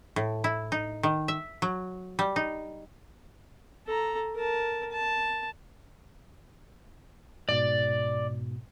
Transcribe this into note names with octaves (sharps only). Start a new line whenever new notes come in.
A2
E4
D#4
D#3
E5
F#3
G3
D#4
A4 A#5
A#4 A5
A5
G#2 B2 D5